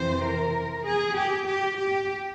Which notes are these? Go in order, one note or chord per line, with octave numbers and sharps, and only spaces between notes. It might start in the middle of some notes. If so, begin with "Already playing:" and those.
Already playing: F2 C3 E3 C5
A#4
G#4
G4
G4
G4